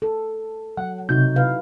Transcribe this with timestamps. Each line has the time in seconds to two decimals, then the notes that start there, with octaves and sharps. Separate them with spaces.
0.02 A4
0.77 F#3 F#5
1.09 C3 D#4 F#4 G6
1.36 E4 B4 F5